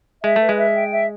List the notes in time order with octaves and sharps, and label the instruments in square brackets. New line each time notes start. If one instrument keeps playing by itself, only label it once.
[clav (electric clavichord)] G#3 [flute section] E5
[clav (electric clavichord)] A3
[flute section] B4
[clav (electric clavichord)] G#3
[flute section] E5
G5
E5